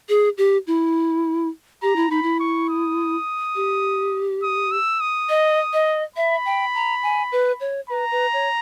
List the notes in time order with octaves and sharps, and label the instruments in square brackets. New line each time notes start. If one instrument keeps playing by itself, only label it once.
[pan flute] G#4
G4
E4
[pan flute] G4 [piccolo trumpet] A#5
[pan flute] E4
[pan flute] D#4 [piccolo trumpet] B5
[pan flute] E4
[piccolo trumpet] C#6
D#6
[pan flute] G4
[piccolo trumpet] D#6
E6
D#6
[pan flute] D#5
D#5
[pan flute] E5 [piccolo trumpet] B5
[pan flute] G5
A#5
G#5
B4
C#5
[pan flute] B4 [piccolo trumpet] A#5
[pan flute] B4
C#5